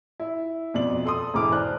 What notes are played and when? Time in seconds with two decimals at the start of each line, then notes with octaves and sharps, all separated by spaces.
0.20 E4
0.74 F2 B2 D5 F#7
1.05 A4 C6 D#6
1.34 E1 G#2 E3 D6 F6
1.52 C5 D5 A5 F#6